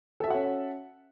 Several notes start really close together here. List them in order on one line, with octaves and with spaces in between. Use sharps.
A4 E5 F#4 F#5 C#4